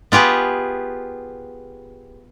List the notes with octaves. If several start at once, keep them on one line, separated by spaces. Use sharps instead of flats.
B3 F4 G4 G#4 B4